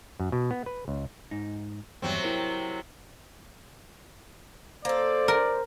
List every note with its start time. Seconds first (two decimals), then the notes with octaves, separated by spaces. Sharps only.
0.20 F#2
0.32 B2
0.51 B3
0.66 B4
0.88 C#2
1.31 G#2 D#4
2.02 E2 G2 C3 F#3 C4
2.23 E4 A#4 C#5
4.85 A#3 A4 C5 D5
5.28 A#4